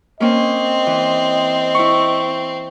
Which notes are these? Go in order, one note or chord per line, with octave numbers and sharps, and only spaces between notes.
A#3 C4 C#4 D#5
E3
E4 C#6